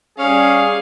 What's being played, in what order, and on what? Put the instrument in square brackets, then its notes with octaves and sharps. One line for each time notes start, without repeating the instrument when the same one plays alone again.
[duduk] G3 [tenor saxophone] C#4 [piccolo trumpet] G#4 [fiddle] F5